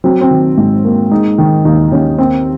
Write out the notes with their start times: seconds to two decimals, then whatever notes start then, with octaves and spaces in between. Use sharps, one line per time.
0.04 F#3 C4
0.21 C4
0.31 D#3
0.57 G#2
0.84 A#3
1.11 G#3 D#4
1.38 D#3
1.65 D#2 D#4
1.92 D#2 C#4
2.18 A#3 C4